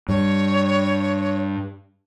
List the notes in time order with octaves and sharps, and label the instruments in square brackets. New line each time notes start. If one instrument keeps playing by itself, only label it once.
[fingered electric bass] G2 [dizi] C#5